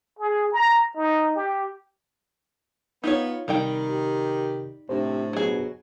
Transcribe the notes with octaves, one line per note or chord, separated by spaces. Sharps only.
G#4
A#5
D#4
G4
B3 D#4 F4 C#5
C3 D#3 G3 D#4 G5
G4
A2 C3 D4 G4 C5
B2 F#3 G#4